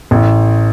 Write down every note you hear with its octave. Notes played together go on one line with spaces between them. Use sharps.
A1